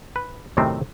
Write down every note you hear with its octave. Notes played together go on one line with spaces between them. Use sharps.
B4
F#2 A2 C3 D#3 A3 C4